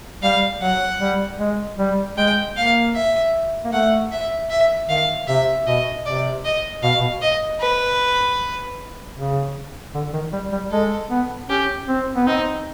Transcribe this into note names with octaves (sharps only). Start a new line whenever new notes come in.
G3 F5
F#3 F#5
G3
G#3
G3
G#3 G5
A#3 F5
E5
A#3
A3 F#5
E5
E5
D#3 F5
C3 E5
B2 D#5
C3 D5
D#5
B2 F5
B2
D#5
B4
C#3
D3
D#3
G3
G3
G#3 A4
B3
C#4 G4
C4
B3
C4 D#4